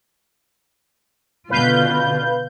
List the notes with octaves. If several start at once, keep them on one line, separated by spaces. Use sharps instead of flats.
B2 D3 F4 B4 F5 G6